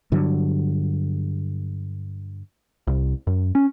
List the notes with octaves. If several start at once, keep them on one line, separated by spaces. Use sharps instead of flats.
G2 D3 F#3
C2
F#2
C#4